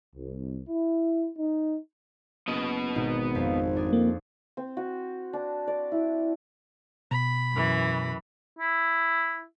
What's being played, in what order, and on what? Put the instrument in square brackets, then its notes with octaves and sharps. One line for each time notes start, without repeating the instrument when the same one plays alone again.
[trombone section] C2
E4
D#4
[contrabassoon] F#1 [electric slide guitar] B3 D#5
[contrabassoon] G#1 [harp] B2 D#4
[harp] F2 B6
D4 G#4
[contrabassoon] F2 [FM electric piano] A#3
[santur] C4
F#4
D4
D5
E4
[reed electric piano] B2 [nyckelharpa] B5
[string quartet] F#2 E3
[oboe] E4